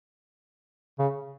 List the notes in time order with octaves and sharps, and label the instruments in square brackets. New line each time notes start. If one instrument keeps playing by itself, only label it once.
[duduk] C#3